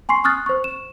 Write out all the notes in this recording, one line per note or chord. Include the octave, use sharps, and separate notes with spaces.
G#5 C6 C#6 C7
C#6 D#6 F6 F#6 A6
C5 C#6
E7